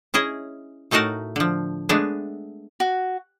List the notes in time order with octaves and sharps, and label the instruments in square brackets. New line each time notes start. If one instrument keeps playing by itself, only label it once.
[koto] C#4 E4 G#4 D#5
A2 A3 D#4 F#4 A#4 A5
D3 F3
G#3 A3 B3 D4 G#5
[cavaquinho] F#4